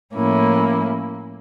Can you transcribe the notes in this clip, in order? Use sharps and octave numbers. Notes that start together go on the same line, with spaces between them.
A2 F3 A#3 C#4 E4